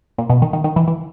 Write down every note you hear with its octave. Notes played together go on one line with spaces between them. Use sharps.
A#2
B2
D#3
D#3
D#3
E3
E3